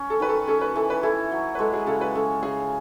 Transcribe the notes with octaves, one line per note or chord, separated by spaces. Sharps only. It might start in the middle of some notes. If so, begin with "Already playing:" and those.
Already playing: C#4
A4
D#3 B4
A4
C#4 A4
B4
E3 A4
B4
E4 A4
F#3
B4
G#3 A4
G#4
C#3 A4
B4
C#4 A4
C#3 G#4